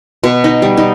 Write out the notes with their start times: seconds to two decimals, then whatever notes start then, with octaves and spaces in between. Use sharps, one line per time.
0.23 B2
0.44 D#4
0.62 G3
0.77 D#4